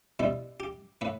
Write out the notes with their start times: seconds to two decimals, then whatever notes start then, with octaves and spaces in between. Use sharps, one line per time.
0.19 B2 G3 E4
0.60 G4
1.01 A2 B4